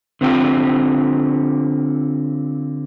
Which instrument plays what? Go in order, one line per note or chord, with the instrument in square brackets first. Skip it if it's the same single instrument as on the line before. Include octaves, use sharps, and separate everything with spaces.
[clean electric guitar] D3 C4 F4 G4